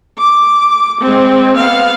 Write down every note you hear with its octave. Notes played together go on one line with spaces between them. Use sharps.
D6
G#3 C4
B3 F5